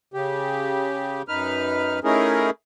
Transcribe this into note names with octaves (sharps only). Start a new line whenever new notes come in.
C#3 G4
F#2 D#4 B4 F6
A3 C#4 D#4 E4 G#4 A#4